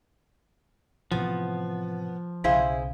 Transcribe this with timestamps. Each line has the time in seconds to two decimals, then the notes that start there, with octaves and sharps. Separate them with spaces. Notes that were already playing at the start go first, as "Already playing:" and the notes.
1.11 A2 C3 E3 F3 B3
2.44 B1 C#3 E4 G#4 C5 F5